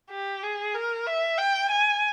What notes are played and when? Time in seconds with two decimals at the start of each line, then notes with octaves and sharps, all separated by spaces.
0.11 G4
0.43 G#4
0.75 A#4
1.07 E5
1.38 G5
1.70 G#5